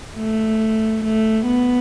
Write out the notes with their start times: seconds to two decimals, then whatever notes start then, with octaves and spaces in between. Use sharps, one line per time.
0.18 A3
1.04 A3
1.47 B3